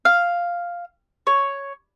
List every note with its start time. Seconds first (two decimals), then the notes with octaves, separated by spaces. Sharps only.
0.05 F5
1.27 C#5